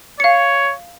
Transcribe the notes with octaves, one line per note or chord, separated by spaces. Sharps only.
C#5 F5 C#7